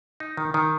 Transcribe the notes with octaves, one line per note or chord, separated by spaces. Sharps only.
D#4
D#3
D#3